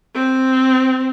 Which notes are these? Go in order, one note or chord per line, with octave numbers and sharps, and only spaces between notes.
C4